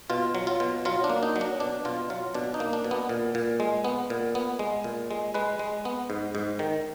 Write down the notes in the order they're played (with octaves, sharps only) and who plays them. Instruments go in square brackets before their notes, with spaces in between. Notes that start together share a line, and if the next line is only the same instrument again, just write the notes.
[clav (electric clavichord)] B2 F4
F#3
F4
B2
F#3 F4
D4
A#3
D#4
F#3
D4
B2 D4
B2 F4
F#3 F4
B2 D4
D#4
A#3
D4
B2
B3
A#2
A#2
G#3
B3
A#2
B3
G#3
A#2
G#3
G#3 B4
G#3
B3
G#2
G#2
D#3